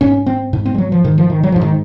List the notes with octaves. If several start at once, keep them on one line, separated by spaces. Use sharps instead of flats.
G#2 C#4
C4
G#2
C4
G#3
F#3
F3
G#2 D#3
F3
D#3
F#3
G#2 F3
D#3